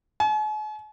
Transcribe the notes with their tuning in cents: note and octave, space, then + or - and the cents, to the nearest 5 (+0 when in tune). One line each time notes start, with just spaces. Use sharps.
G#5 +45